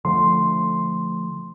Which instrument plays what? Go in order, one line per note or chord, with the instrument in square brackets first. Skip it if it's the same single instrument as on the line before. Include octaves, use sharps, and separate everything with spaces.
[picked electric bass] D3 F3 A3 [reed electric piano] C6